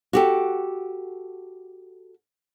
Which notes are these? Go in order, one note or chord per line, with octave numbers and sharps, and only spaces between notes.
F#4 G4 A4